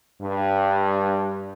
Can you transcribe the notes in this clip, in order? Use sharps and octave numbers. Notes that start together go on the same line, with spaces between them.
G2